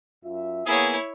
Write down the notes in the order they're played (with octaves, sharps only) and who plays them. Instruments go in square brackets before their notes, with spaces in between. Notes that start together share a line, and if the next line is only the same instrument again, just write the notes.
[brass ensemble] F#2 F4 E5
[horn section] A#3 G#4 [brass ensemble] B3 [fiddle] E4 C#5